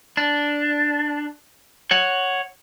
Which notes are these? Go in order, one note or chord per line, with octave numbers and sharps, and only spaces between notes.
D4
C#5 F#5